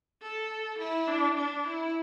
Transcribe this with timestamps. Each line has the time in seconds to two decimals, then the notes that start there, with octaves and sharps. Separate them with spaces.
0.22 A4
0.79 E4
1.07 D4
1.36 D4
1.64 E4